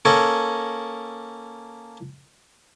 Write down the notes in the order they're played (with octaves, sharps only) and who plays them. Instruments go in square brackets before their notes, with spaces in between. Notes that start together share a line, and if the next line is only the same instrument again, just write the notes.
[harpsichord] A#3 C#4 A4 C#5 D#5